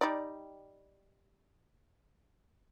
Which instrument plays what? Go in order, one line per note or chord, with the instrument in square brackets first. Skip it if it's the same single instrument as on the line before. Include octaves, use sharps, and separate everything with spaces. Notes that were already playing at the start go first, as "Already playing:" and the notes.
[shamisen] G3 D#4 D5